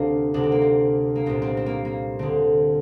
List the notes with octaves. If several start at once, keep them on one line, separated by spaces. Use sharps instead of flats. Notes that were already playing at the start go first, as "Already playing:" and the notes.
Already playing: D2 C3 A#3 C4 D4
D2 C3 D4
C4
A#3
C4
A#3
C2 A#2 C4
C4
C4
A#3
A#3
D2 D3 C4